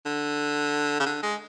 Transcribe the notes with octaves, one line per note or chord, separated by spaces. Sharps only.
D3
C#3
D3
G#3